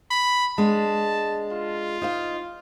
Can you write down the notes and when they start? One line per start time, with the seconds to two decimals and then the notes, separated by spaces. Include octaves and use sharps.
0.11 B5
0.58 G#3 B3 D4 A5
1.52 F4
2.02 D#4 C5 F5